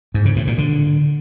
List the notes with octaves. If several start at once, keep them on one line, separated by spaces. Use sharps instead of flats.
G#2
C#3
A2
A#2
D3